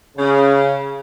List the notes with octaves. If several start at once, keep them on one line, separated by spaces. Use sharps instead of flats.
C#3